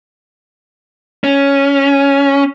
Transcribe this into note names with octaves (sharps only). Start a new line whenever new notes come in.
C#4